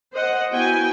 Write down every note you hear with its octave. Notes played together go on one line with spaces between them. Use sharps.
C5 D#5 F#5
B3 E4 F#4 G5 G#5